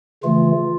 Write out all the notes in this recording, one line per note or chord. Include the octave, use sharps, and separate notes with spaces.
C#3 E3 A3 F4